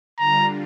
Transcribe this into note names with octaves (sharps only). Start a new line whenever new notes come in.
D3 G3 D4 F4 A#5